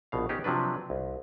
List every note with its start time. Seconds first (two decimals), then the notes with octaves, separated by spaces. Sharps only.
0.12 A#1 B2 F5
0.29 B3 C#4 D#4 G4 G#4
0.44 C3 F3 F#3 D4 B4
0.90 C2